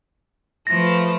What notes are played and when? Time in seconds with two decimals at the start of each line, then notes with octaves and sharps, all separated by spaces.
0.67 F3 A3 B4 A#6